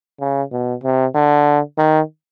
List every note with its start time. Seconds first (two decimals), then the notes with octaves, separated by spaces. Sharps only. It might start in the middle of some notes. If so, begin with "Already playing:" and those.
0.20 C#3
0.52 B2
0.83 C3
1.15 D3
1.78 D#3